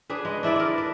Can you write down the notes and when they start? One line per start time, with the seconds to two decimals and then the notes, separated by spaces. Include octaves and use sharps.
0.10 D4 G#4 B4
0.25 G#3
0.43 D4 E4 B4 D5
0.56 A#4 D5
0.78 B4